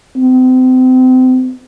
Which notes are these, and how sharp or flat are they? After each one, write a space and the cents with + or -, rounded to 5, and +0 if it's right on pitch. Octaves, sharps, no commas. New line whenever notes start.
C4 -35